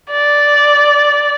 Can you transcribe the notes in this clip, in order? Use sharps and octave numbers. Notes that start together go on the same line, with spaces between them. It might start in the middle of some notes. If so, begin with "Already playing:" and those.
D5